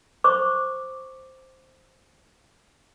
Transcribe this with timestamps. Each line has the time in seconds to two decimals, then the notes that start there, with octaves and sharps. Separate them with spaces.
0.24 C5 C#6 D6